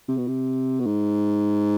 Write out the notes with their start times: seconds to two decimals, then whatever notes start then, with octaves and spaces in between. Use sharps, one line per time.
0.08 C3
0.17 B2
0.27 C3
0.80 B2
0.86 G#2